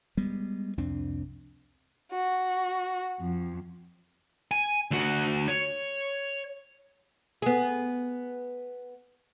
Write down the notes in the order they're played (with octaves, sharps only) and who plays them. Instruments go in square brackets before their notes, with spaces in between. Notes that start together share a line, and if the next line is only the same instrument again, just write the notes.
[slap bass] G3 G#3 B3
C2 F2 C4 D4
[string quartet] F#4
F2
[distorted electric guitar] G#5
D2 F#4
C#5
[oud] B3 G#4